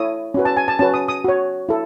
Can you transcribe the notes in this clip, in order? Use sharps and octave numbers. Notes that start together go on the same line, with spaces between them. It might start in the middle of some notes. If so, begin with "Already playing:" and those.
Already playing: E4 A4 C#5 D#6
C#4 F#4 B4
A5
G#5
A5
C#4 F#4 B4 A5
D#6
D#6
F#4 C#5
E4 A4